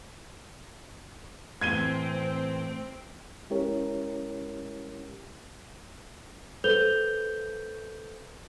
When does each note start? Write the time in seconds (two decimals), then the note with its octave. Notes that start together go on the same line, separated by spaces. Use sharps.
1.61 A2 E3 C4 G#6 D#7 G7
3.50 G#3 C#4 E4 G4 A#4 C#5
6.64 A4 B4 C5 G6 F7 G7